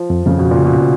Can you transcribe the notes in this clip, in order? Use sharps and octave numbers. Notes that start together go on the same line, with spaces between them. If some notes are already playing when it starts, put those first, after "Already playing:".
Already playing: F3
F2
F2 C#3
F2 B2
A#2
C#3
B2
C#3